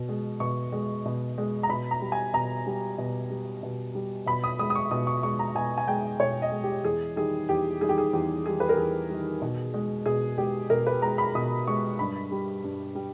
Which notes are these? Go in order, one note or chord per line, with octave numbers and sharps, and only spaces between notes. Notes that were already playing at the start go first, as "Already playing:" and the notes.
Already playing: B2
G#3
B2 C#6
G#3
B2
G#3
A#5
B2 B5
A#5
G3
G#5
B2 A#5
G3
B2
G3
B2
G3
B2 B5
D#6
G#3 D#6
D#6
C#6
B2 D#6
C#6
G#3 C#6
A#5
B2 G#5
G#5
G#3 G5
B2 C#5
D#5
G#3
G4
E2 G#4
D#3 G3 G#4
E2 G4
D#3 G3 G#4
G4
G#4
E2 G4
D#3 G3 G#4
B4
A#4
E2 G#4
D#3 G3
B2
G#3
B2 G#4
G#3 G4
B2 A#4
B4
G#3 A#5
B5
B2 D#6
G#3 C#6
G2 B5
G3
G2
G3